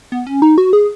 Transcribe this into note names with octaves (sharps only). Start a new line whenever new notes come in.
B3
C#4
D#4
F#4
G#4